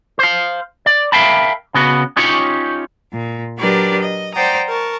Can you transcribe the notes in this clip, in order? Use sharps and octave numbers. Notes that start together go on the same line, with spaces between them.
C5 F5
D5
A#4 E5 F5 G5 A5 B5
C#3 B3 F#4
C#4 D#4 F4 G4 C#5
A#2
F#3 D4 G4 A#4 B4 D5
D#5
C5 D5 F#5 G5 A#5 D#6
A#4 A5 C#6